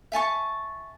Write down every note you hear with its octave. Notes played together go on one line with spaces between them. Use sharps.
E5 G#5 A5 C#6